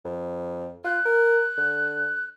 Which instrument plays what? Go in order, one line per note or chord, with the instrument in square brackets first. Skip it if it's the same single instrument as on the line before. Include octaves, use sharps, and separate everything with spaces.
[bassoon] F2
[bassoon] F4 [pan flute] F#6
[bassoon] A#4
D3